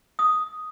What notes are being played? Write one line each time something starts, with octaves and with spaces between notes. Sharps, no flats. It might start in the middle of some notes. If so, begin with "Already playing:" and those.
D#6